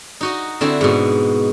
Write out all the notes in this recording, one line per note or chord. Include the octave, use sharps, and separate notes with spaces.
D#4 F#4 D#5
D3 C4 E4 F#4
G#2 B2